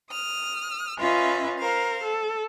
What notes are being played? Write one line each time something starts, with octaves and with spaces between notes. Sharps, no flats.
D#6 F6
C#4 F4 B4 D#5 E5
A#4 C5 F5
A4